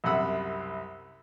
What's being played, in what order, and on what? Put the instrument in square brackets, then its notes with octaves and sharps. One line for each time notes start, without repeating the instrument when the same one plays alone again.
[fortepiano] C2 F#2 C3 F#5 B5 E6